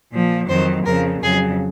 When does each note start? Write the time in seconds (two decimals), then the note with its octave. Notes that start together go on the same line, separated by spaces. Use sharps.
0.12 A#2 F3
0.48 F2 D#3 F#3 C5
0.85 F2 C#3 F3 A#4
1.22 F2 C#3 F#3 G#4